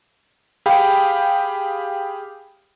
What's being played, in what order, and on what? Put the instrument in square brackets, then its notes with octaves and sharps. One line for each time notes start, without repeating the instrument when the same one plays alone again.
[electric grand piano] G4 G#4 F5 G5 B5